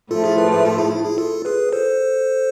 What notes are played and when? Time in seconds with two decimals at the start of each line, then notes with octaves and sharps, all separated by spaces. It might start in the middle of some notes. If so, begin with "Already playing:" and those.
0.11 A2 F3 A3 F4 A4
0.24 E4 G#4
0.37 G#4 B4
0.51 G#4 B4
0.65 F4 A4
0.78 E4 G#4
0.91 E4
1.05 E4 G#4
1.18 F4 A4
1.45 G#4 B4
1.72 A4 C5